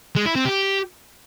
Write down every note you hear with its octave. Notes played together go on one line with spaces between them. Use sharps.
G#3
E4
C4
G4